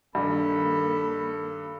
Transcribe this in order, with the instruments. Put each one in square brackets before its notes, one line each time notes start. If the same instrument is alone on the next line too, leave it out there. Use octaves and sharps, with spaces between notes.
[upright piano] G2 [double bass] D#3 A#3 [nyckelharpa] A4 [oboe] B5